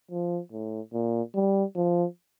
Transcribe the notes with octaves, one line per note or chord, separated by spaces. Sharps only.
F3
A2
A#2
G3
F3